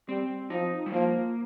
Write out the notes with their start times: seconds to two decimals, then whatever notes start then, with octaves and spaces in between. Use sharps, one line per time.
0.09 G3 C4
0.50 F3 D#4
0.86 G3
0.92 F3 A#3